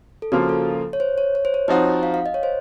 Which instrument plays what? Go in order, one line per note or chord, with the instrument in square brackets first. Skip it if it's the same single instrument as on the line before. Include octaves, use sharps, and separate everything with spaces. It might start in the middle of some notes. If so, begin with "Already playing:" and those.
[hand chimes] A4
[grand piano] C#3 F3 A#3 F4 [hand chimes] F#4
[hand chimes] A4
C#5
C5
C#5
C#5
C5
C#5
[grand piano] F3 C4 D#4 F#4 [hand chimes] D#5
[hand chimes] F5
F5
D#5
C#5
C5